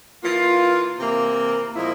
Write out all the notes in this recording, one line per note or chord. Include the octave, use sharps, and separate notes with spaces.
E3 A#3 F4
C3 E3 A#3
A#2 F3 G#3 E4